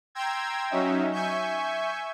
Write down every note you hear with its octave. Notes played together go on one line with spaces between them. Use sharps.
G5 A#5 C6 E6 G#6
F#3 C#4 D#4 E5
E5 G#5 C#6 G6